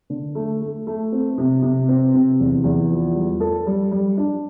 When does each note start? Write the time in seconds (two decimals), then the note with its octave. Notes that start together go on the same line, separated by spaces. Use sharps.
0.10 D3
0.35 A3
0.61 A3
0.87 A3
1.12 C4
1.38 C3
1.62 C3
1.89 C4
2.14 C3
2.40 E2
2.64 E2
2.90 F3
3.15 G3
3.40 A4
3.66 G3
3.91 G3
4.17 D4